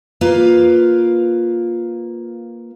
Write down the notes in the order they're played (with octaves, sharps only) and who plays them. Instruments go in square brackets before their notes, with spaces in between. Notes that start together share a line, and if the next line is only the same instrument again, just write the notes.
[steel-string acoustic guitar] A#3 F4 B4 F5